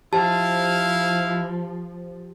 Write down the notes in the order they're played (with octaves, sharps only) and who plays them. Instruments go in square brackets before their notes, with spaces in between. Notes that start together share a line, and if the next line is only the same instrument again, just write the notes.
[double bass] F3 [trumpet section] E4 F5 [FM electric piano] G4 C5 [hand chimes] A5